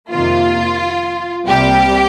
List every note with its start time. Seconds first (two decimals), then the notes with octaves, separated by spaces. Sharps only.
0.12 F2 C3 D#3 A#3 F4
1.46 C2 C3 G3 A#3 G4